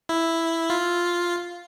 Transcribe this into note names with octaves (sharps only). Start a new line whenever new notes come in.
E4
F4